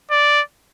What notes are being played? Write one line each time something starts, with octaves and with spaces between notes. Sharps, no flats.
D5